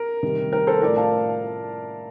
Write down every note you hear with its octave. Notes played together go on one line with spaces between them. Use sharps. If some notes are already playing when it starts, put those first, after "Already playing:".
Already playing: A#4
C3 D#3 G3
A#4
A4 C5
A2 F3 A3 A#4 D5
F5 A5